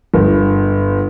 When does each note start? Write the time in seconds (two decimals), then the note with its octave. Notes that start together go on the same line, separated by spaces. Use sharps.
0.14 G1